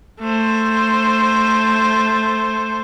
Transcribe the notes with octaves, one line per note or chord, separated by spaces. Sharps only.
A3 C5